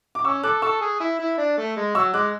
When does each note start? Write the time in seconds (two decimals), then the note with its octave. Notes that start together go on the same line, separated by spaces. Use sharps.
0.15 D6
0.24 C#4 C#6 E6
0.43 A4 D6 F#6
0.62 A4 C#6 E6
0.81 G#4
1.00 E4
1.19 E4
1.38 D4
1.58 A3
1.77 G#3
1.95 F#3 C#6 E6
2.14 G#3 D6 F#6